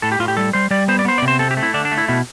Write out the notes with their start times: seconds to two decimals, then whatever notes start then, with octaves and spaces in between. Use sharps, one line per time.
0.02 A2 A4
0.12 G4
0.19 A2 F4
0.28 G4
0.37 G3 A4
0.53 G3 C5
0.71 G3 D5
0.88 B3 C5
0.99 D5
1.05 B3 C5
1.18 C3 D5
1.28 C5
1.39 C4 A4
1.51 G4
1.57 A3
1.63 E4
1.74 D3 D4
1.85 D4
1.92 A3
1.98 E4
2.08 B2 E4